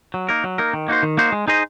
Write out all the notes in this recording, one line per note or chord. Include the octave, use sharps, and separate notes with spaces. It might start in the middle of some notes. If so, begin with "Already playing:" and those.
F#3
A#3 D#4 A#4
F#3
A#3 D#4 A#4
D#3
A#3 D#4 F#4 C5
D#3
A#3 D#4 F#4 C5
G#3
D#4 G#4 C5 D#5